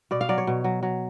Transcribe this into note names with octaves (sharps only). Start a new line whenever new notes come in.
B2 D5
F5
F#3 D5
C#5
B2
F#3
F#3